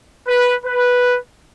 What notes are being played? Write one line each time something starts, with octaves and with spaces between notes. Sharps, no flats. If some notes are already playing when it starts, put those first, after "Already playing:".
B4
B4